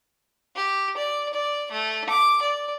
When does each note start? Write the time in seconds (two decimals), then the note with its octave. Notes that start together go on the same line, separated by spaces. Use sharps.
0.56 G4
0.97 D5
1.34 D5
1.72 A3
2.09 D6
2.42 D5